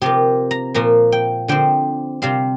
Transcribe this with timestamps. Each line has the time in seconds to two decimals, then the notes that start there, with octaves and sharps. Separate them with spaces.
0.02 C3 F3 A#3 G4
0.51 A#5
0.74 A#2 F3 A#3 A#5
1.12 G5
1.48 D3 F3 C4 G5
2.22 C3 G3 C4 F5